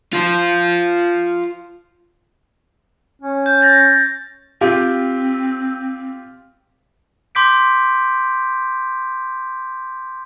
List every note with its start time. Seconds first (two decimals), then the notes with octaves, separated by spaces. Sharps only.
0.13 F4 C5
3.22 C#4
3.46 G6
3.61 G6 A6 A#6
4.61 C4 F4 G4
7.35 C6 D6 G6 B6 D7